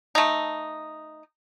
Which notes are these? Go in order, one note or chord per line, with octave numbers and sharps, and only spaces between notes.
A3 D#4